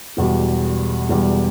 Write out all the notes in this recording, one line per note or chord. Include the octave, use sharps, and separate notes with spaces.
E1 E2 B2 G3
E1 E2 B2 G3